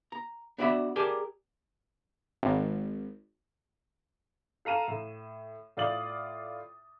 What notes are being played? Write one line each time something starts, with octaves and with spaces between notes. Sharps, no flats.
A#5
B3 D4 F#4 D5 E5 B5
G4 G#4 A#4 D5 G#5 A5
G#1
A4 F5 A#5 D#7 E7
A2
A2 F4 D5 D#6 A6 F#7